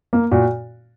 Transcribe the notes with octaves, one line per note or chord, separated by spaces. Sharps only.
A#3
A#2 F#4